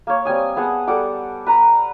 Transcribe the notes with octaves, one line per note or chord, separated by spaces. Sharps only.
A#3 C#5
G3 C4 G#5 D#6
B3 G#4 F#5 A5
G3 A4 F#5 D6
B4 A#5